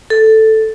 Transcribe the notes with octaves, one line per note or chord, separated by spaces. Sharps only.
A4